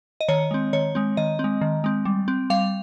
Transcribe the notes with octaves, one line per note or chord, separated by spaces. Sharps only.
D#5
D#3 C#5
G#3 C4
D#3 C#5
G#3 C4
D#3 D#5
C4
G#3
D#3
G#3 C4
G3
C4
G3 F5